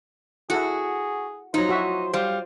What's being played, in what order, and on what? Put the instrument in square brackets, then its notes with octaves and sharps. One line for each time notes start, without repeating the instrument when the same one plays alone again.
[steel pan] E4 A4 F#5 [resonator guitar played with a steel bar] F#4 [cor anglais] G#4
[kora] F3 F#3 [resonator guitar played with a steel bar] D#4 [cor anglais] C5
[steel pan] E4 F#4 E5
[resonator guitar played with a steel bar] G3 [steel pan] C5 [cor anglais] F5